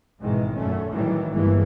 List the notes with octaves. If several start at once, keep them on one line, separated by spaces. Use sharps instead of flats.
G#1 G#2 B2 D#3 E3 G#3
F#2 A#2 A3 C#4
A2 D#3 E3 F#3 G3
G1 G2 E3 G#3 A#3